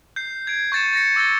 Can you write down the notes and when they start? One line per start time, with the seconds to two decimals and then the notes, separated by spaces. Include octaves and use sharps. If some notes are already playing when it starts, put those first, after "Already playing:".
0.16 G6 C7
0.47 G#6 C7 D7
0.72 C#6 G6 A6 C#7 E7
0.93 A6 A#6 C#7
1.16 D6 E6 G6 A6 G7